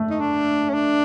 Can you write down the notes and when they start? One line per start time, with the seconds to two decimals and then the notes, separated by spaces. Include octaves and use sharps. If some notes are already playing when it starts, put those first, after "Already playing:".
Already playing: A3
0.10 D#4
0.20 D4
0.70 C#4
0.74 D4